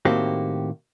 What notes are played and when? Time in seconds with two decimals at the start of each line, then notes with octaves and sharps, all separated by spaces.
0.05 A2 D#3 A#3 C4 F#4 G4